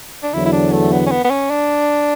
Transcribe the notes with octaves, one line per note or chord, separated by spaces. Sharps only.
D4
E2 D3 F#3 E4
E4
D4
A3
B3
C#4
B3
B3
C#4
D4